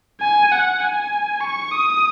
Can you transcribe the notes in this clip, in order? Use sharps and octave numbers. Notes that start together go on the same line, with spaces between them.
G#5
F#5
G#5
C#6
D#6